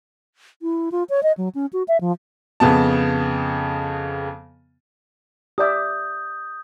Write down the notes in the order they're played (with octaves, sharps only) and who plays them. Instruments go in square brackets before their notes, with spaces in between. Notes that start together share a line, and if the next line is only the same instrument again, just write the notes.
[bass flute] E4
F4
C#5
D#5
F#3
C#4
F#4
E5
F3
[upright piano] F2 C#3 B3 A5
[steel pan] G4 D5 E5 [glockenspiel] D#6 G6